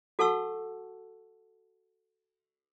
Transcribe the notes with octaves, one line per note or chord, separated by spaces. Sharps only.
F#4 A4 F#5 A5 C#6 E6